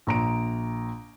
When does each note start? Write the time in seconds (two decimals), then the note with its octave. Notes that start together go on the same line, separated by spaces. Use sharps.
0.07 A#1 A#5 D7